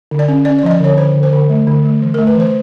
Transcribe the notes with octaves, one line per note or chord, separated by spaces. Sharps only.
D3
D5
C#4
C#4 D5
D5
F3 D#5
D5
D3 C#5
D3 C5
D3
C5
D3
A3
D3
A3
E3
A3 A#4
B4
E3 C5